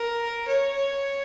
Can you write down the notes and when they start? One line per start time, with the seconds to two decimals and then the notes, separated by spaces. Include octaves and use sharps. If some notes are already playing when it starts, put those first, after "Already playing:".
Already playing: A#4
0.47 C#5